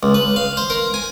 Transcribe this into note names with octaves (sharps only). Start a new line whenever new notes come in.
C#2
B4
F5
C5
A#4
G#5